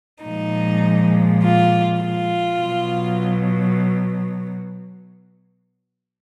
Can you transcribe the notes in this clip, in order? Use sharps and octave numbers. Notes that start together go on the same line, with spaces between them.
A#2 F3 G#3 D#4
F4
F4
B2 F#3